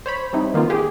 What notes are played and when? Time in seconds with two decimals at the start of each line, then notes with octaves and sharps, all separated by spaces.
0.06 C5 C#5 B5
0.33 G3 C4 D#4 E4
0.54 D#3 A#3 B3 F4
0.70 G4 G#4